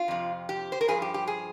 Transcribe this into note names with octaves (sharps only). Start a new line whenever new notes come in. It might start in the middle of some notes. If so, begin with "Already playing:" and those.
Already playing: F4
F2 C3 F3
G4
C5
A#4
G2 F3 G#4
G4
G4
G#4